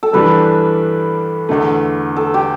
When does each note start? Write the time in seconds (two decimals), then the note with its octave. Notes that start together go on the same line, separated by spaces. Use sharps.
0.03 A4
0.13 G2 E3 G3 D4 G4 B4
1.49 E2 D3 A3
2.16 A4
2.34 G4